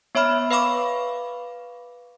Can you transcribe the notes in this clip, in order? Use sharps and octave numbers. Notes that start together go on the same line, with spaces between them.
B3 C#5 E5 B5 F6
B4 F5 B5 C#6 D6